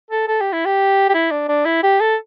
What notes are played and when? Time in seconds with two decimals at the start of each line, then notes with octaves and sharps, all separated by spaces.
0.11 A4
0.28 A4
0.41 G4
0.53 E4
0.65 G4
1.09 G4
1.14 E4
1.31 D4
1.49 D4
1.65 E4
1.83 G4
2.00 A4